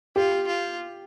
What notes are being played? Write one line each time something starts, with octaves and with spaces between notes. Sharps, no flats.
F4 G4
F4